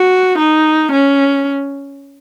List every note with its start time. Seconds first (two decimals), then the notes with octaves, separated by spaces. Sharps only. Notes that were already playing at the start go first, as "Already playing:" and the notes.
Already playing: F#4
0.39 D#4
0.92 C#4